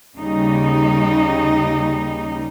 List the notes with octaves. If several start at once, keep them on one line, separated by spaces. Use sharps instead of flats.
D#2 C#3 G3 D#4